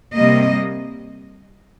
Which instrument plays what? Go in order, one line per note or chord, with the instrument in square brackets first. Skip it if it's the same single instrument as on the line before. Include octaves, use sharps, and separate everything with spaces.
[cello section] C3 G3 A#3 D#5